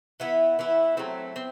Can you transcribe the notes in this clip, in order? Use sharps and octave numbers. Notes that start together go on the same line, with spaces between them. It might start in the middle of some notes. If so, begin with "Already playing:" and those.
E3 B3 E4
E3 B3 E4
F#3 A3 C4
C4